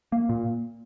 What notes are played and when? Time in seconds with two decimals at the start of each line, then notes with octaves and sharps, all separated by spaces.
0.12 A#3
0.29 A#2